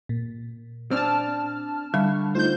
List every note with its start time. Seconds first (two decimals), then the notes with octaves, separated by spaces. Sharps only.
0.09 A#2
0.91 C4 D4 A5 F6
1.94 D3 G3 E5 B5 C#6
2.35 A3 D#4 F4 C5 G6